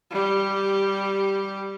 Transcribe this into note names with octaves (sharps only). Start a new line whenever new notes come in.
G3 G4